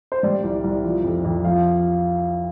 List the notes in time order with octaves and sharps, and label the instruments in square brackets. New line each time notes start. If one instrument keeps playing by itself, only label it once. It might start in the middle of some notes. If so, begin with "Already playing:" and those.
[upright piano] C5
G3 D5
C2
C2
F3
F2
F2
F3 F5